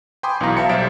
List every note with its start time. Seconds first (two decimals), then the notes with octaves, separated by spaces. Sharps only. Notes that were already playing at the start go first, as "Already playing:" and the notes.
0.23 G5 G#5 B5 C6 D6 D#6
0.41 B1 B2 E3 F5 A#5
0.57 E5 F5 A5 C#7
0.69 B1 G3 C5 E5 A6 D7